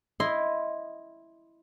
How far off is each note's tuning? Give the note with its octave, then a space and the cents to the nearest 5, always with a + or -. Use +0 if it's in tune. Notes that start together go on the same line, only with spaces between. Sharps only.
E4 +0 D#5 +0 C6 +0